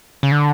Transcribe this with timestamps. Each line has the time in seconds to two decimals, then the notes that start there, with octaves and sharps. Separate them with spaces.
0.23 C#3
0.32 D3